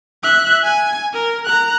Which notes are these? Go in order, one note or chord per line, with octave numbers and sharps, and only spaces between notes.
E5 F#6
G#5
A#4
A#5 F#6